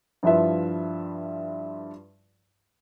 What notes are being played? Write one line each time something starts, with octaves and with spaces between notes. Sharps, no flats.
G2 F3 E4 F4 B4 E5